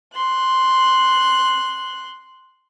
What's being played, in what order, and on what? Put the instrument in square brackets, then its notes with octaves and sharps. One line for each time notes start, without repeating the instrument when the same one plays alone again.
[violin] C6 F#6